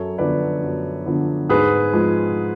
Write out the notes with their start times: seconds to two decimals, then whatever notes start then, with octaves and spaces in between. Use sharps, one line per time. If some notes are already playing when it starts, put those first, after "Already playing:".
Already playing: F#2 A4 C#5
0.18 D3 F3 B3 B4 D5
0.62 F#2
1.06 D3 F3 B3
1.49 G#2 G#4 B4
1.93 F3 G#3